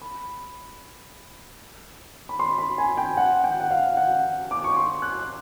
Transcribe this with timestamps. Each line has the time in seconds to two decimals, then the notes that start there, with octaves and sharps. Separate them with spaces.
0.02 B5
2.29 B5
2.39 C6
2.58 B5
2.78 G#5
2.98 G5
3.17 F#5
3.44 G5
3.60 F#5
3.71 F5
3.97 F#5
4.51 D6
4.64 C#6
4.76 C6
5.02 F#6